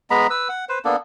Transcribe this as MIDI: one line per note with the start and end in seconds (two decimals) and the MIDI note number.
0.10 0.27 56
0.10 0.27 59
0.10 0.27 82
0.10 0.27 83
0.30 0.48 71
0.30 0.48 88
0.49 0.65 78
0.69 0.79 71
0.69 0.79 72
0.85 0.96 58
0.85 0.96 59
0.85 0.96 62
0.85 0.96 69